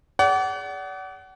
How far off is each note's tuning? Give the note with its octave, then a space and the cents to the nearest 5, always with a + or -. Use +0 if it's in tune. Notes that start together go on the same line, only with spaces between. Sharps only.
G#4 +0 D5 -35 F#5 +30